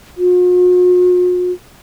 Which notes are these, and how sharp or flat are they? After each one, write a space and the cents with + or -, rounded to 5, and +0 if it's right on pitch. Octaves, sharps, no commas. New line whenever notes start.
F#4 -45